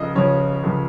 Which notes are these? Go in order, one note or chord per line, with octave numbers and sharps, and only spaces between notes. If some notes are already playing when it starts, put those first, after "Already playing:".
Already playing: C#2 C#3 F3 D#5
C#2 C#3 F3 C#5
C#2 C#3 F3